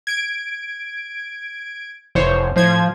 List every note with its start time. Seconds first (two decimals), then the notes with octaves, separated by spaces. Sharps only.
0.07 G#6 D7
2.15 F1 E3 C5 C#5
2.56 A2 F3 C5 G#6